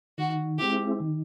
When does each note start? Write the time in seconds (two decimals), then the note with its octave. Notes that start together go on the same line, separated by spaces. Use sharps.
0.18 D#3 F#4
0.58 G#3 C4 E4 G4
1.00 D#3